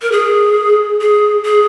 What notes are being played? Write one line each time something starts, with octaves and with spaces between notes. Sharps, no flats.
A#4
G#4
G#4
G#4